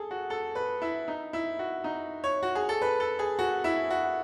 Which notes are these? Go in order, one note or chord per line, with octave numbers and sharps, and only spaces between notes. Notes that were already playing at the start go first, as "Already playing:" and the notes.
Already playing: G#4 A4
F#4
A4
B4
E4
D#4
E4
F#4
D#4
C#5
F#4
G#4
A4
B4
A4
G#4
F#4
E4
F#4